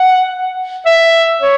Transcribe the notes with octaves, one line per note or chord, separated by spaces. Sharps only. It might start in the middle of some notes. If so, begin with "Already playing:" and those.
Already playing: F#5
E5
C#5